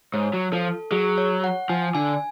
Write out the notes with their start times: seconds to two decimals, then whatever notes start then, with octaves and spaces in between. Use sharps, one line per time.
0.13 G#2 C#5
0.33 F#3
0.52 F3 A4
0.91 F#3 G#4
1.18 C#5
1.44 F#5
1.69 F3 G#5
1.95 D3 G#5